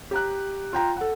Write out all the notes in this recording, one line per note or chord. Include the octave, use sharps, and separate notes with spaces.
G4 A#5 F#6
F4 G5 A#5
A4 F#5